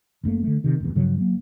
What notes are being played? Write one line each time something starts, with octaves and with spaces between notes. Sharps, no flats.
F#1 F#2 A3 A#3
D3 A3
C3 D#3
F1 E2
G2 C#3 F3 F#3
F#3 A#3